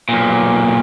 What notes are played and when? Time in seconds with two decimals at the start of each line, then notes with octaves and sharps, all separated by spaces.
0.09 B1 A#2